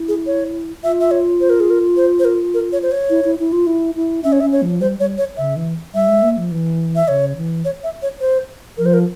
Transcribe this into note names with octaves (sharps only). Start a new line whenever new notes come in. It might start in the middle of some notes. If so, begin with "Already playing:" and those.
Already playing: E4
G#4
C#5
F4 E5
E5
C#5
C5
A#4
G#4
A#4
C5
C5
A#4
A#4
C#5
C5
C#5
E4
E4
E4
F4
E4
E4
C#4 E5
C#5
E5
C#4
C#5
F3
G3 C5
G3 C#5
C#5
C#3 E5
E3
G3 E5
G#3
A#3
F3
E3
E5
C#3 C#5
E3
C#5
E5
C#5
C5
F3 A#4
C5
A#4